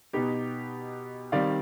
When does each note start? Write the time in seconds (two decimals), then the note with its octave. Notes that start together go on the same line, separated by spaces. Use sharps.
0.13 B2 B3 D#4 G4
1.32 D#3 G3 C4 D5 F5